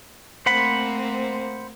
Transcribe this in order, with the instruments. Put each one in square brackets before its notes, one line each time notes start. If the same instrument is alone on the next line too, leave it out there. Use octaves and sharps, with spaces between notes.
[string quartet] A3 A#3 C4 [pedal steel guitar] C5 F#5 B5